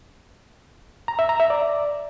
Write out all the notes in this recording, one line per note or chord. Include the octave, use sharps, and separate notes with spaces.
A#5
E5
A#5
E5
D5